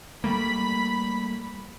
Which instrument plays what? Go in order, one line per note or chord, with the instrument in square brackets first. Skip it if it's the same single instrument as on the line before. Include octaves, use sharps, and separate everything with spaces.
[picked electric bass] G3 A3 A#3 [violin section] B5 B6